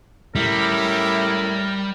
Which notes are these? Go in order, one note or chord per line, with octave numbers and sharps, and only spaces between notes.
A2 G3 C#4 E4 A#4